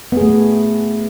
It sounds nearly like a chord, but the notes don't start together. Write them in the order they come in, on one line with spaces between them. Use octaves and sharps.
B3 G#4 A3